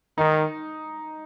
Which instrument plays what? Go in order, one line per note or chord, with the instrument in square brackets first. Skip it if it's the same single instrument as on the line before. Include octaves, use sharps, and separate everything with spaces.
[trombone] D#3 [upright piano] D#4